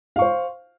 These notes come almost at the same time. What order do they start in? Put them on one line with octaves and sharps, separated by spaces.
F5 C#6 C5